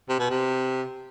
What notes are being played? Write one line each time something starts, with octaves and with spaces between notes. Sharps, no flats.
C3
B2
C3